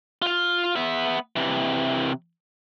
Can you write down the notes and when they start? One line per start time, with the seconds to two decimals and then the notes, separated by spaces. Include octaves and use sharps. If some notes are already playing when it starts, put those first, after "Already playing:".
0.22 F4 F5
0.76 B3 E5
1.36 C3 E3